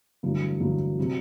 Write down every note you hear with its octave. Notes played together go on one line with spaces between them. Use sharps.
A1 G2 D3 F#3
A1 G2 D3 F#3
C3 F#3